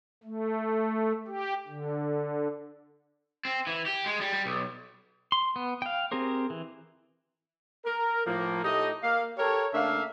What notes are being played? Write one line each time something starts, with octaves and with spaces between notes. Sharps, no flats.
A3
G4
D3
C4
E3
G4
G#3
G3
G3
B1
C6
B3
F5 G5
C4 G4 G#4 A#4 C5
E3
A#4
A2 F3 A#3
A2 A3 D#4 G4 D#5
A#3 F5
G4 A4 A#4 C#5
C#3 A3 A#3 D4 E5 F5